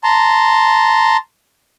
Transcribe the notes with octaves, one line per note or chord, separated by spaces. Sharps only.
A5 A#5 C6